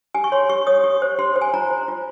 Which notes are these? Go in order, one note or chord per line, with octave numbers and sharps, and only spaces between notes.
G4 G#5
C#6
C#5 C6
G4 C#6
C#5 D#6
G4 C#6
C5
G4 C6
C5
G#5
F4 A#5
C5
F4